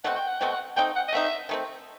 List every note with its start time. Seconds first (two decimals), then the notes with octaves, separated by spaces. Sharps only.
0.04 B2 A3 C4 F#4 F#5
0.16 G5
0.27 F#5
0.39 B2 A3 C4 F#4 G5
0.52 F#5
0.76 A3 C4 D#4 G5
0.95 F#5
1.08 D#5
1.13 A3 C4 D#4 E5
1.49 D#3 A3 C4